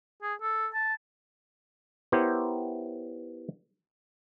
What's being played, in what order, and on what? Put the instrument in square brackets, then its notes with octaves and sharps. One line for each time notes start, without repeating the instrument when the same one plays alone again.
[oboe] G#4
A4
A5
[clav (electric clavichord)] B3 E4 G4 A#4 C5 C#5